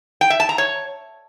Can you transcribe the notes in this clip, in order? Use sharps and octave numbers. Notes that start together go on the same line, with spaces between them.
G5
E5
A5
A#5
C#5